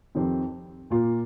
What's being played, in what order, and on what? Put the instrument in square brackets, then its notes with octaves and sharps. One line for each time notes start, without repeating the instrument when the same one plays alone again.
[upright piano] F2 D#3 C4 G4
A#2 A#3 F4